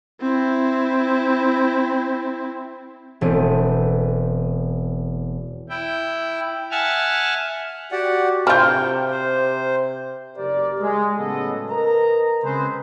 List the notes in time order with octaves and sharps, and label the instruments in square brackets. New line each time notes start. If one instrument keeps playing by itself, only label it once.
[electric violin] C4 E4
[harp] E1 A3 C4 D#7
[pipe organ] E4 G5
E5 F#5 G#5 A5 F6
[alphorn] F#4 [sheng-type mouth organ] G4 D5 F#5
[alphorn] C3 [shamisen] C4 F4 [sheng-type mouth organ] G5 [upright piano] F6 G6
[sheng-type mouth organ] C5
[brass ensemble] F#1 G4 A#4 D5
G#3
A2 C#3 F#3 B3 A4 D#5
A#4 B4 D#5 A#5
C#3 G#3 C4 G#4 B4 C5